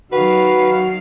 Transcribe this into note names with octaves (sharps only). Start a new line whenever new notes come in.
D#3 F#3 F#4 B4 F5